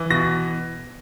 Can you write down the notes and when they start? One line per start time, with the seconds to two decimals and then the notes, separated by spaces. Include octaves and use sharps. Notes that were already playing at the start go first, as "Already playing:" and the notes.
Already playing: E3
0.10 B2 A#6